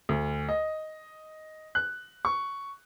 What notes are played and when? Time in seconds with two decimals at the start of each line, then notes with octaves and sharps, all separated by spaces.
0.09 D2
0.49 D#5
1.75 F#6
2.25 C#6